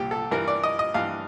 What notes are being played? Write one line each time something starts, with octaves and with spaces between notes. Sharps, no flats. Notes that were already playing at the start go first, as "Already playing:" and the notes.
Already playing: C2 A#2 G4
A4
G2 E3 A#4
D5
D#5
D#5
G2 E3 F5